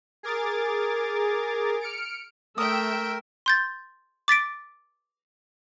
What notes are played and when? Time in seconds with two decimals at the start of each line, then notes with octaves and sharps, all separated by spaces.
0.23 G#4 A#4 D6 A6
1.81 F6 C#7 D7
2.58 A3 A#4 E5 G5 D#6 E6
3.46 C6 G6 A6
4.28 D6 A6 B6 D7